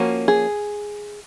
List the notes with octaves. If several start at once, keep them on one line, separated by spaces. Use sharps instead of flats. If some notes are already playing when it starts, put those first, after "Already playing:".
Already playing: F3 A#3 C#4 F#4
G#4